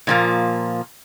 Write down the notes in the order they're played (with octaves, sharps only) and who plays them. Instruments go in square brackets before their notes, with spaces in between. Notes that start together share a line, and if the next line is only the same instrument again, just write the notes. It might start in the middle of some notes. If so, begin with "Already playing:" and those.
[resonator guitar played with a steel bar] A#2 F3 A#3